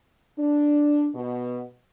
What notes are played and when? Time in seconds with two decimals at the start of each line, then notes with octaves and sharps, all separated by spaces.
0.38 D4
1.14 B2